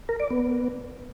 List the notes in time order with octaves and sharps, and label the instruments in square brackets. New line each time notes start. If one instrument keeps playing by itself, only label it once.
[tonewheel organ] A#4
D5
B3